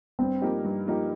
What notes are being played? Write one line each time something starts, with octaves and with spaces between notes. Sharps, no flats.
G2 C4
F3 A#3 D#4 G4
G2
F3 A#3 D#4 G4